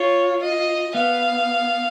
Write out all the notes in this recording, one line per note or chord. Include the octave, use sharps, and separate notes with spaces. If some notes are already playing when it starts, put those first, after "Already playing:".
Already playing: F4 C#5
D#5
B3 F5